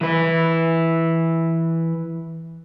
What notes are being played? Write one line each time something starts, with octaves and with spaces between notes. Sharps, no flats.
E3 B4